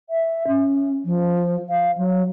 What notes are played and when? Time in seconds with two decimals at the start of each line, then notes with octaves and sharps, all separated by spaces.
0.10 E5
0.48 C#4
1.05 F3
1.70 F5
1.98 F#3